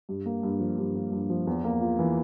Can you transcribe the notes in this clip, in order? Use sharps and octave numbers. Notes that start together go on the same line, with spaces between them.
G2
A#3
G2
F3
G2
A#3
G2
F3
E2
A#3
F4
E3